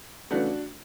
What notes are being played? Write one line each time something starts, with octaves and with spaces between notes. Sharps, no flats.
C#3 E3 A3 D4 F#4